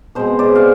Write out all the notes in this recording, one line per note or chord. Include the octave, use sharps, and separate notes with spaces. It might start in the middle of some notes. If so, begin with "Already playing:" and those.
B2 G#3 C4 C5
D5
F5